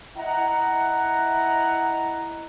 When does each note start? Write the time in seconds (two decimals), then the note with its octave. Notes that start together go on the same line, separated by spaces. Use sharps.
0.18 E4 D#5 F#5 A#5